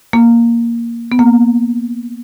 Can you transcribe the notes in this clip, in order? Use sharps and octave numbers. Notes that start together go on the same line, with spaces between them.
A#3
B3
A#3